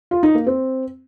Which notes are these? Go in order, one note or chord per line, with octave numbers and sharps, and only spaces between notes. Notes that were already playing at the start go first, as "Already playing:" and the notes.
F4
D#4
A#3
C4